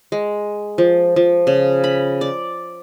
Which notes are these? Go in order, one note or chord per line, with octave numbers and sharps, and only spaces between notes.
G#3
F3
F3
C#3
B5
D5